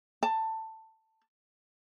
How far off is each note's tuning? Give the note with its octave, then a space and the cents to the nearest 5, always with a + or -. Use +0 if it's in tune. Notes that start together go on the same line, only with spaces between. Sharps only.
A5 +15